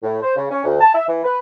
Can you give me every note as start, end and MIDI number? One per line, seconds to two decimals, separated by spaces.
0.03 0.17 45
0.22 0.36 72
0.36 0.46 49
0.50 0.61 61
0.64 0.78 38
0.80 0.91 81
0.94 1.08 76
1.08 1.21 52
1.23 1.39 71